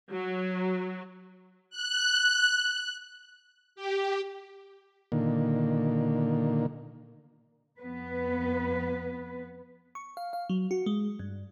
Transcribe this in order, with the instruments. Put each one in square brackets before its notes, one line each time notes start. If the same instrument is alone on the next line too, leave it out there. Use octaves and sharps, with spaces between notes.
[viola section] F#3
[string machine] F#6
G4
[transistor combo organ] A#2 D3 D#3 A#3
[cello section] F2 B3 B4
[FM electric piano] C#6
F5
F5
F#3
F#4
G#3
G2